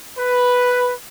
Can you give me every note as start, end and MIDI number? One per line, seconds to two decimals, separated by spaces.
0.18 0.91 71